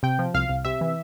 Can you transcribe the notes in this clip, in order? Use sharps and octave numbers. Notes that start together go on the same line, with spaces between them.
C3 G5
F3
C2 F5
C2
C3 E5
E3